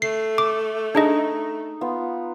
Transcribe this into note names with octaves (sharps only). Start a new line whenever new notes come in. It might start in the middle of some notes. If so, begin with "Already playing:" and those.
A3 C7
D6
D4 D#4 G#4 D#5
B3 F4